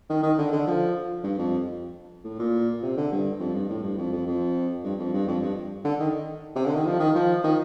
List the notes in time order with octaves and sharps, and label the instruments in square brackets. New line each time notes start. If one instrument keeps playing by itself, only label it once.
[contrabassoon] D#3
D#3
D3
D3
F3
G2
F2
A2
A#2
C3
D3
G2
F2
G2
A2
G2
F2
F2
F2
G2
F2
G2
F2
G2
D3
D#3
C3
D3
D#3
F3
D#3
F3
D#3